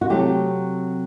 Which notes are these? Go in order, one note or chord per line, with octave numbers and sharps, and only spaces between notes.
F#4
C3 F#3 A3 C4 G4